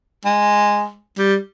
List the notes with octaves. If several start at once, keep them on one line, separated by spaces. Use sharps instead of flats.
G#3
G3